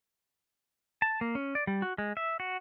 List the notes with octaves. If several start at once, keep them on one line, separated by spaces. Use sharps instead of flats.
A5
A#3
C#4
D5
G3
F#4
G#3
E5
F#4